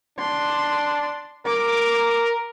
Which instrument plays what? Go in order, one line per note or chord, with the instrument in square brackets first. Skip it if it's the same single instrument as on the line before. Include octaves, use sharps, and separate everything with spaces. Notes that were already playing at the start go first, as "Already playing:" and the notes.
[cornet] D4 [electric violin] C6
[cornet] A#4 [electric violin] D6